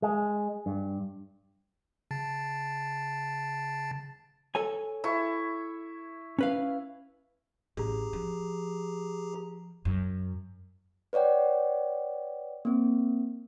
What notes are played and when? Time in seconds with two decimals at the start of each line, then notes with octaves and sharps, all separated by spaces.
0.02 G#3
0.66 G2
2.11 C#3 A5 A6
4.55 A4 C#5 G#5
5.04 E4 C#6
6.39 C#4 B4 F5
7.77 A1 G4 G#4 A#5
8.13 F3
9.85 F#2
11.13 B4 C#5 D5 F#5 G5
12.65 A#3 C4